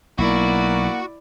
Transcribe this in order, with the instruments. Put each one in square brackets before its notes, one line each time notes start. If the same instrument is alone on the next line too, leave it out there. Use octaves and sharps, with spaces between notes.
[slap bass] B1 [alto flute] A#3 [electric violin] E4 D5 [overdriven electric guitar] F#4